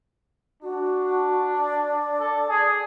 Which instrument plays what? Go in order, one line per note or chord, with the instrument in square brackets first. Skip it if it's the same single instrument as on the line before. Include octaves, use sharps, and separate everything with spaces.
[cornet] D4 [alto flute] F#4
[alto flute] D5
[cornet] A4
G#4